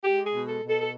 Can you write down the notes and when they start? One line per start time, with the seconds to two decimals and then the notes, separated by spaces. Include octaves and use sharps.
0.04 G#3 G4
0.26 G#4
0.33 B2
0.48 A4
0.62 B2
0.69 A4
0.81 A4